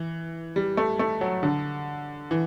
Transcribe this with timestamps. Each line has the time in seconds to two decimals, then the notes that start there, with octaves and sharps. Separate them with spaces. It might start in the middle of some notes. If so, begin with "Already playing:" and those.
Already playing: E3
0.56 G3
0.77 A3
0.99 A3
1.21 F#3
1.43 D3
2.31 E3